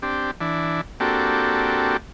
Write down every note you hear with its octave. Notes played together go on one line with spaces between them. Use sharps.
C4 D4 G4
E3 D4
A#3 C4 D4 F#4 G4 A4